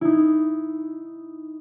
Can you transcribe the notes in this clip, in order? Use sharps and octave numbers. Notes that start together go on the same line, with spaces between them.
D#4 E4